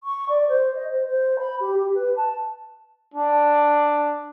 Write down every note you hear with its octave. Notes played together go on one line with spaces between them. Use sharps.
C#6
D5
C5
D#5
C5
C5
B5
G4
G4
B4
A5
D4